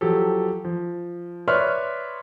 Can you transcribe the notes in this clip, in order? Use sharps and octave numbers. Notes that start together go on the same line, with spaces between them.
F3 F#3 G4 A4
F3
B4 C#5 D5 E5 C6 F6